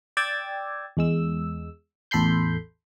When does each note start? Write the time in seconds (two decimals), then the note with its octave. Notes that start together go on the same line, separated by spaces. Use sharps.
0.17 D5 G5 E6 G#6 A6
0.97 E2 G#3 E6
2.11 A1 E2 A4 B5 C6 G6